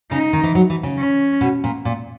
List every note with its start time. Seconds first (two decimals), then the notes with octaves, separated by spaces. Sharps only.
0.11 C#3 D#4
0.33 D#3
0.44 E3
0.55 F#3
0.70 E3
0.83 C#3
0.98 C#4
1.41 B2
1.64 A#2
1.85 A#2